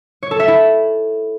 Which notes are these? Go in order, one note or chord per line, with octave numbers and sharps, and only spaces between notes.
C#5
A4
E5
E4